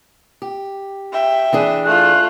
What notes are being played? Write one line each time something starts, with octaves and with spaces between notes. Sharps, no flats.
G4
E5 G5
E3 D4 G#4
A3 F4 F#6